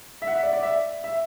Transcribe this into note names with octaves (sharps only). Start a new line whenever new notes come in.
E5
F#5
E5
D5
D5
E5
E5